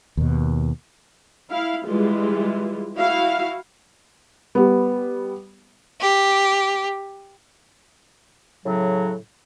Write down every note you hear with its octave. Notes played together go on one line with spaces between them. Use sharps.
D#2 B2
E4 F5
E3 G3 G#3 F4
E4 F#4 F5
G3 B3
G4
A2 C#3 F#3